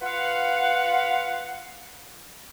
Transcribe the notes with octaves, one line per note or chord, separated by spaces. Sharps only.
F4 B4 F5 F#5